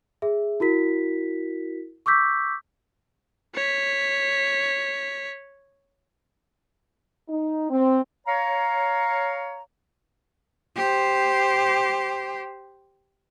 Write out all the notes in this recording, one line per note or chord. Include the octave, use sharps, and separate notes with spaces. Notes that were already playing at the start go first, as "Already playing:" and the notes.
G#4 E5
E4 F#4 A#4 B6
C#6 D6 E6 G6 B6
C#5 B6
D#4
C4
C#5 F5 A#5
G4 C5